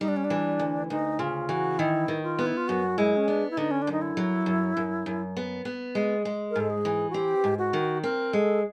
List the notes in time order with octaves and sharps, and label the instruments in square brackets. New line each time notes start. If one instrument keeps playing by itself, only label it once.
[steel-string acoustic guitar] G3 [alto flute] D#4
[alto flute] D4
C#4
D4
[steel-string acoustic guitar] E3
D2
[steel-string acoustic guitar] D2 [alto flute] D#4
[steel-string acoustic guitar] C#3 [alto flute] F4
[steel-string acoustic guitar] E3 [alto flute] F#4
[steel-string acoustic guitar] D#3 [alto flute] E4
[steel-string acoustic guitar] D#3
[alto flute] F4
[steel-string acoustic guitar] B3
[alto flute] E4
F4
[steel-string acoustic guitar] F#2 [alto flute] F#4
[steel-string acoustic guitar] G#3 [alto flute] E4
[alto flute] C#4
[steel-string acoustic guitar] B3 [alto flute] D4
[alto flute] E4
[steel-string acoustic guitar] D3 [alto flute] D#4
[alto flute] C#4
D4
[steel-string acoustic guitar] F#2 [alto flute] D#4
[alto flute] E4
[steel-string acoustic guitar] F#3
F#2
F#2
F#2
B3
B3
G#3
G#3
[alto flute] A#4
[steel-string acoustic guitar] G#2 [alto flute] A4
[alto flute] G#4
[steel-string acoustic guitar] E3
[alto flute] F#4
[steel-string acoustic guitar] C4 [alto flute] G4
[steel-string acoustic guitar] G#2
[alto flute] F#4
[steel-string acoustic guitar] D#3
[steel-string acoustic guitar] C4 [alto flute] A#4
[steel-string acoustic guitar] G#3 [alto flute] A4